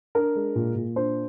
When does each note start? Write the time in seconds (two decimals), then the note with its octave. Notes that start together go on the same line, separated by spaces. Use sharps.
0.15 D4 A#4
0.35 G#3
0.55 A#2
0.76 A#2
0.96 D4 C5